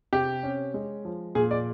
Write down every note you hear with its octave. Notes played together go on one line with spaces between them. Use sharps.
C3 G4
C#4
G#3
F3
A#2 G#4
D5